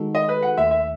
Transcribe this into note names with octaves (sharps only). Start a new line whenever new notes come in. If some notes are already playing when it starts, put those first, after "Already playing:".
Already playing: D#3 G#3 D#4 F#4 A4
D#5
B4
F#5
D#2 D#3 A3 E5
E5